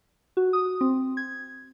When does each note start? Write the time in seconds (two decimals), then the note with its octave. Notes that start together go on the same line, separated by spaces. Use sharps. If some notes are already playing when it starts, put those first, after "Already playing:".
0.37 F#4
0.53 D#6
0.81 C4
1.17 G#6